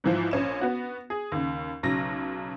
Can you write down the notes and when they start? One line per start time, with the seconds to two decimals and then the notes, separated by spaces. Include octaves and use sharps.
0.04 G#2 E3 F3
0.31 A#1 C#4 E7
0.61 B3 F#4
1.10 G#4
1.32 D#2 C#3
1.83 B1 C#3 F#3 A#6